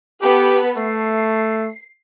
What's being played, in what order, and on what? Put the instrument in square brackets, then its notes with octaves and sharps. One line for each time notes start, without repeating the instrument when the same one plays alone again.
[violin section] B3 A4 B4 [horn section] G4
[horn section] A3 [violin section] C7